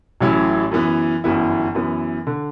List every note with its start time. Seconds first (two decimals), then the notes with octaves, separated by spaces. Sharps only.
0.21 A1 A2 F#3 C#4 E4
0.72 F#2 E3 B3
1.24 G1 F#2 E3 B3 E4
1.75 F#2 E3 B3
2.27 D3